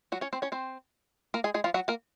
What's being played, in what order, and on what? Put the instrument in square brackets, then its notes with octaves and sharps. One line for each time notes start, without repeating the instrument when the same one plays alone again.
[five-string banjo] F#3 F#4
C#4 C#5
C4 C5
C#4 C#5
C4 C5
A#3 A#4
G#3 G#4
G#3 G#4
F3 F4
F#3 F#4
A#3 A#4